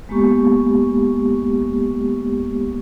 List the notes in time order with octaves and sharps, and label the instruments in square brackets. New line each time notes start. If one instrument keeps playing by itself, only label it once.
[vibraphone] G#3 A#3 B3 G4 C#6